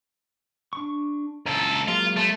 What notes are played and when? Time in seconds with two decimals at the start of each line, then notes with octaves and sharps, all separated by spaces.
0.73 D4 C#6
1.46 C#2 A4 A#5
1.88 F#3 G#3 A#3 F4
2.17 A3